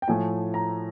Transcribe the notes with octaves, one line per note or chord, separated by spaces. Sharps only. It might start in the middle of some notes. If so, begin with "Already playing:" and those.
G5
A2 F3 A3 G#5
A#5